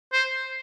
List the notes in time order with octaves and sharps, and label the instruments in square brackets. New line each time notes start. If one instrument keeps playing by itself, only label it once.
[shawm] C5